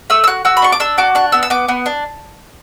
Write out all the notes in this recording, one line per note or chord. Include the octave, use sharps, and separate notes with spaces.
A3 E6
E6
F#4 F#6
F#4 E6
B5
D4 C#6
D6
D4 E6
F#4 D6
D4 F#6
B3 E6
E6
B3 D6
B3
D4